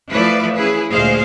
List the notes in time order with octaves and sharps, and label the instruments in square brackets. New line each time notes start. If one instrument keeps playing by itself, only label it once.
[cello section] E3 F3 A3 B4 D5 E5
C#4 E4 G#4 B4
D2 A#2 G#3 G#4 C5 F5